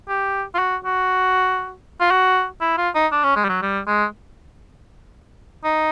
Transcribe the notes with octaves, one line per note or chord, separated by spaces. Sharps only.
G4
F4
F#4
F#4
F4
F#4
E4
F4
D#4
D4
C#4
G#3
G3
F#3
G3
G#3
D#4